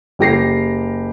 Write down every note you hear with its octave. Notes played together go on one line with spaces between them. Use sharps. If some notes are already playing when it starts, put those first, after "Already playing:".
F#1 G4 A#6 C7